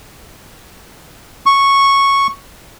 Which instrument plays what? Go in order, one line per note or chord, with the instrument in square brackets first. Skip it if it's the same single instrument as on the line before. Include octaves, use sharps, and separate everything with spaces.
[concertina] C#6